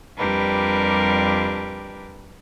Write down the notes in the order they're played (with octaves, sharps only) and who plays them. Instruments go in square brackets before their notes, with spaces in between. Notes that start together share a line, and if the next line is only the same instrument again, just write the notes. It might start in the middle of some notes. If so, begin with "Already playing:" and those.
[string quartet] F2 G3 D4 G4 A#4 B4